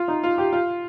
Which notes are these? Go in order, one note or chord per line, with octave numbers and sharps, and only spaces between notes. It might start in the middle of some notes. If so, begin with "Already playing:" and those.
Already playing: F4
D#4
F4
G4
F4